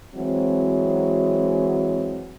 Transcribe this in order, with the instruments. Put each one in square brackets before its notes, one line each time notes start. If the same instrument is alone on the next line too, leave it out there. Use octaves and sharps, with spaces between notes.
[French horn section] E3 F#3 G#3 C4